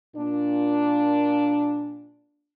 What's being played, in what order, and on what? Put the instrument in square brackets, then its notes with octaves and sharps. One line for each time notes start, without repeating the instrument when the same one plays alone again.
[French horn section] A#2 D4